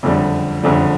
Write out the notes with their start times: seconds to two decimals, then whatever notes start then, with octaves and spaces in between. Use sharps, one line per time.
0.03 F#1 F2 D3 G3
0.63 F#1 F2 D3 G3